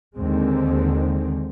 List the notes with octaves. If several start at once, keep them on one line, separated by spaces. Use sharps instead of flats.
D#2 D3 D#3 G#3 C4